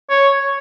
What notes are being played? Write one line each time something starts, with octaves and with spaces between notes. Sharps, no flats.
C#5